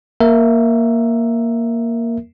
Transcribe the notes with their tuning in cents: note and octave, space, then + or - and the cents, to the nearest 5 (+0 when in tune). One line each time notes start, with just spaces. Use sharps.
A#3 +0 A#4 +0 E5 +0